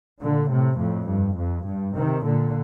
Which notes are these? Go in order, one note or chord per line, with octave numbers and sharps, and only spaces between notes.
A#2 D3
A2 C3
F2 A2
G2
F2
G2
C3 D#3
A#2 D3